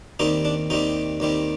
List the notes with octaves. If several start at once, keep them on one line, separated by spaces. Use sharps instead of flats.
D#2 D#3 G3 C4 D#4
D4
D#2 D#3 G3 C4 D#4
D#2 D#3 G3 C4